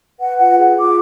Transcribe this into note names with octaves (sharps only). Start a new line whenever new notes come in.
B4 F#5
F4 F#5
G#4
F4 D6